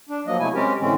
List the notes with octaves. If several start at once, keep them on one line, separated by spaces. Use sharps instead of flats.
D4
F3 F#3 A#3 D#5
C3 F#3 A3 E4 G#5
G#3 C4 C#4 G4 A#4
A2 D3 E3 G#3 C4 C#4